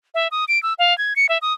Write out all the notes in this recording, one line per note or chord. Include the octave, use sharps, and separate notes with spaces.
E5
D#6
D7
E6
F5
G#6
C#7
E5
D#6